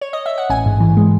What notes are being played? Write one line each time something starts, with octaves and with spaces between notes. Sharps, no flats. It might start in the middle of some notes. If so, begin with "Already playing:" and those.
C#5
D#5
E5
F#5
A1 G#5
G#2
E3
G#3